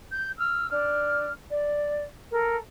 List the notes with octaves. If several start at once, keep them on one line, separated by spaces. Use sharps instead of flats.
G6
E6 F6
D4 F6
D5
A4 A#4